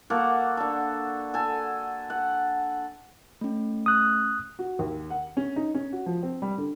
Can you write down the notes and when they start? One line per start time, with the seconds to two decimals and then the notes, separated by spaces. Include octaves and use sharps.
0.10 A#3 F#4 A4 F#5
0.57 D3 A4
1.34 A4 G#5
2.10 F#5
3.41 A3 C#4
3.86 D#6 F#6
4.59 F#4
4.79 D#2
5.10 F#5
5.37 C#4
5.56 D#4
5.74 C#4
5.93 F#4
6.06 F3
6.23 C4
6.42 G3
6.58 D3